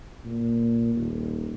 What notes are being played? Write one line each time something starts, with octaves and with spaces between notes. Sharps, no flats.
A#2
D#1